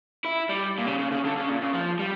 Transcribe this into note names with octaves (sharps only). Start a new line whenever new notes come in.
E4
G3
A#2
C#3
C#3
C#3
D3
C#3
A#2
C#3
F3
G3